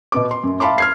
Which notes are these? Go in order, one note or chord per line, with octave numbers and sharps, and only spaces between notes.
B2 B3 D6
C6
F#2
E5 F5 A5 B5 C6 D6
F6 G#6 C7